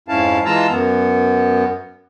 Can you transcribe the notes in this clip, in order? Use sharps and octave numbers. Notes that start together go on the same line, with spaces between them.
F2 G#2 C#4 E4 F5 A5
E3 G#3 F4 A5 A#5 E6
F#2 B3